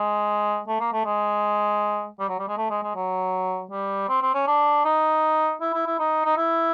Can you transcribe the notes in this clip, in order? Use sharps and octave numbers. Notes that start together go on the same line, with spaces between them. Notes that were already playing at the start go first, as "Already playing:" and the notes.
Already playing: G#3
A3
A#3
A3
G#3
G3
F#3
G3
G#3
A3
G#3
G#3
F#3
G3
C4
C4
C#4
D4
D#4
E4
E4
E4
D#4
D#4
E4